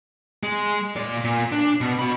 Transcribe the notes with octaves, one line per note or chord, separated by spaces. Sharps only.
G#3
A#2 D5
A#2
D4
B2
F#4 B5